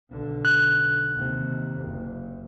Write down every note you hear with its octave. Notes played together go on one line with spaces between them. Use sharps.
B1 D3
F#6
D#2 C3
F#1